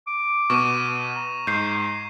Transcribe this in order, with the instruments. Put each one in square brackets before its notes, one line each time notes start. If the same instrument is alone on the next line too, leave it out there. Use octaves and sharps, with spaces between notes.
[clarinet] D6
[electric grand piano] B2 B3 [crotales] C#6 D#7
[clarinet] A#5
[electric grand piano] G#2 [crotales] G6 C7